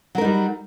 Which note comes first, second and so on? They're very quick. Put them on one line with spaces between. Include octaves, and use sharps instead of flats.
F#3 A#4 D#4 G3